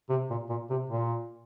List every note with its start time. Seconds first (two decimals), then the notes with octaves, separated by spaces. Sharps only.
0.10 C3
0.30 A#2
0.49 A#2
0.70 C3
0.90 A#2